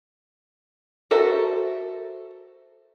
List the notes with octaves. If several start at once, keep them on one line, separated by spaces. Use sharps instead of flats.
F#4 A4 A#4 C5 E5